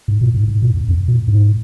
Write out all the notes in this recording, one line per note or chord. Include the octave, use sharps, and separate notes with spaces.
G#2
A#2
G#2
G#2
A#2
F#2
F2
A#2
G#2